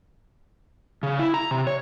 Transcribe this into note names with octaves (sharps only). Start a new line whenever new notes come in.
C#3
E4
A#5
C3
C#5